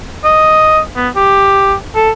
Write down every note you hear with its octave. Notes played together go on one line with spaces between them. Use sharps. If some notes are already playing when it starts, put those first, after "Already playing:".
D#5
B3
G4
A4